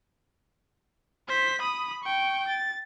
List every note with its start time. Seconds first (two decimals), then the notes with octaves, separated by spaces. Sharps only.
1.28 C5 B6
1.61 B5 D#6
2.04 G5 C#6
2.49 A6